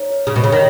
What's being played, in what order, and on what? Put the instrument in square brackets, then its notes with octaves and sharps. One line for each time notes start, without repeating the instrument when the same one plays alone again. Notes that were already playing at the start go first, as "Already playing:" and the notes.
Already playing: [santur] D#4 C#5
A#4
[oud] C#3 [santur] C#4
[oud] B2
[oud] C#3 [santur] F#3
[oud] D#3